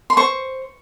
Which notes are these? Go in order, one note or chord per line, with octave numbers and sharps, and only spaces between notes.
C6
C5 C#6